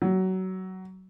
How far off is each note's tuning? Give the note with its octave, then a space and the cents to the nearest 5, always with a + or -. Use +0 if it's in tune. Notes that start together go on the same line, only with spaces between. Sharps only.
F#3 +20